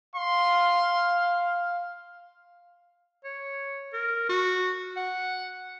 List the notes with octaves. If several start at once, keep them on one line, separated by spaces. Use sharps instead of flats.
F5 C6
C#5
A#4
F#4
F#5